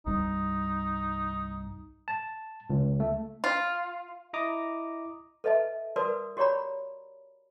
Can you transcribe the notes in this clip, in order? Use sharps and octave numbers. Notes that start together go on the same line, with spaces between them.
C2 G2 G3 D#4
A5
C#2
A3
F4
E4 D#5 A#5 D6 D#6
A4 B4 D#5 E5 A5
F#4 A#4 B4 D5 A5 D#6
F#4 G4 C#5 D5 A#5 B5